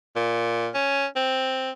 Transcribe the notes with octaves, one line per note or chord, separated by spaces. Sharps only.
A#2
C#4
C4